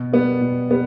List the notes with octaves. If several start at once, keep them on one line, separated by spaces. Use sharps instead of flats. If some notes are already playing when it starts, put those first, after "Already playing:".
Already playing: B2
G3 B3
B2
G3 B3